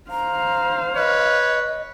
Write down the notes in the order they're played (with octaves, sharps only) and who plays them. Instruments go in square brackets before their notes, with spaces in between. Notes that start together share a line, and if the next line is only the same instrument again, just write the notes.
[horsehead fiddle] C5 F5 [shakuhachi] A#5
[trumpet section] B4 C#5 [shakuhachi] D#5